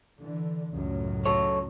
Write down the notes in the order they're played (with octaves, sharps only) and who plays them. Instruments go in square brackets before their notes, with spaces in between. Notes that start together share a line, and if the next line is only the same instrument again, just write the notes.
[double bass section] D3 E3
C#2 F#2 A2
[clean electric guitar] F#3 A4 C#5